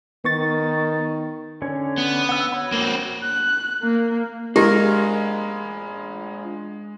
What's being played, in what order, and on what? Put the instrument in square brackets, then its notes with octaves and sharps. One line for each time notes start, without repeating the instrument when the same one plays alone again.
[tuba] D#3 [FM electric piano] B3 C#6 A6
[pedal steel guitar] D3 C#4 C#5
[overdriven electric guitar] B3
[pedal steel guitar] F#5 E6
F#4 C#5 B5
[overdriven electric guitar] A#3 C4
[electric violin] F#6
A#3
[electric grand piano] G#3 [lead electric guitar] D4 F4 [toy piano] G4 [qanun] A#4